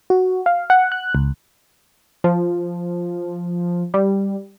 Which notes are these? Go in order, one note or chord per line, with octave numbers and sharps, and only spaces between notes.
F#4
F5
F#5
F#6
C#2
F3
G3